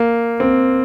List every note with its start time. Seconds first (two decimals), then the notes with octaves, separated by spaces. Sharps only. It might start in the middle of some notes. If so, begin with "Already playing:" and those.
Already playing: A#3
0.40 C4